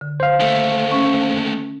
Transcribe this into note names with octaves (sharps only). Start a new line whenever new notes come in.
D3
C5 F5
D#2 A3
C#4 C#6